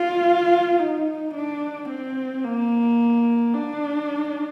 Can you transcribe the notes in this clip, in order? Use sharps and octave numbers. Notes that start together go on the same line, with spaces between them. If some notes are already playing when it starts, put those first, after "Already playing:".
Already playing: F4
D#4
D4
C4
A#3
D4